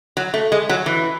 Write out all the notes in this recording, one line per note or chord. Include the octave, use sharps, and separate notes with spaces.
F#3
A3
G#3
F#3
E3